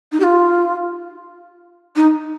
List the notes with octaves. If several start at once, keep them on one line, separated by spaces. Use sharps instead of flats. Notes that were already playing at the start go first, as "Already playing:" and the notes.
D#4
G4
F4
D#4